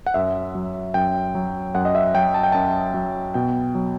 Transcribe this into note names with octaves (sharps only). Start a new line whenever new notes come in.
F#5
F#2 E5
F#3
F#2 G5
F#3
F#2 F#5
D#5
E5
F#3 G5
A5
G5
F#2 A5
F#3
B2 G5
F#3